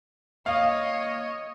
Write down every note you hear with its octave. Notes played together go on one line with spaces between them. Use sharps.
A#3 C#5 D#5 F5